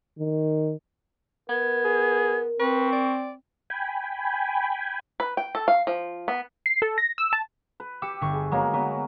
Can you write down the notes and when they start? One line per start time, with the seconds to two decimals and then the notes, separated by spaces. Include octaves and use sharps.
0.19 D#3
1.50 B3 A#4 G#6
1.85 G#4
2.60 C4 B4 C#6
2.93 D5
3.70 G5 G#5 B5
5.20 B4
5.37 G5
5.55 A4
5.68 F5
5.87 F3
6.28 B3
6.66 C7
6.82 A4
6.98 A#6
7.18 E6
7.33 A5
7.80 B4
8.02 G4 D6 E6 C#7
8.21 G1 C#6
8.33 G#4
8.52 F#3 G#3 A#3 B3
8.74 F#3 B3